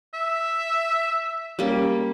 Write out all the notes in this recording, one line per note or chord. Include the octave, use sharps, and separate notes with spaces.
E5
G3 A#3 C#4